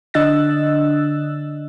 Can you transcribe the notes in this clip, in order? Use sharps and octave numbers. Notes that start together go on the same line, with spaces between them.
D3 D4 D#5 E6 F#6 A6